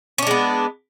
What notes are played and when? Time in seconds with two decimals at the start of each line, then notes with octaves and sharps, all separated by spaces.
0.18 C#4
0.22 D4
0.27 G#3
0.31 B3